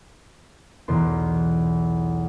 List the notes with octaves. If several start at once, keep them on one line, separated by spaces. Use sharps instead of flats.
B1 E2 E3 B3 C6